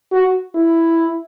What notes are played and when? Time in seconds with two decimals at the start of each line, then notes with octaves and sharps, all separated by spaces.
0.12 F#4
0.55 E4